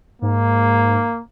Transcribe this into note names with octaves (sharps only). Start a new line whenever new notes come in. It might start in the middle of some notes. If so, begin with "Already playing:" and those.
G#2 A#3